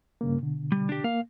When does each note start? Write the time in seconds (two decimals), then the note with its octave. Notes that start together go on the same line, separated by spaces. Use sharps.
0.21 G2 C#3 A#3
0.42 B2 D3
0.72 G3
0.89 D4 G4
1.04 A#3 F5